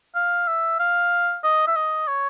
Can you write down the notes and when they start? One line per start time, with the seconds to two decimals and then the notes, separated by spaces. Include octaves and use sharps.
0.15 F5
0.47 E5
0.79 F5
1.44 D#5
1.67 E5
1.76 D#5
2.08 C#5